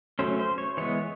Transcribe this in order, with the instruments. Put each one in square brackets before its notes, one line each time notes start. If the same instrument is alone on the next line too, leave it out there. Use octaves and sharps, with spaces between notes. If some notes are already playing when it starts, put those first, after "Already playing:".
[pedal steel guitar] F#3 A3 C#4 C5
C5
C#5
E3 G#3 B3 C#5